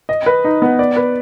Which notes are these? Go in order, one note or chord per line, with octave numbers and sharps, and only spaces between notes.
D#5
B4
D#4
B3
D5
B4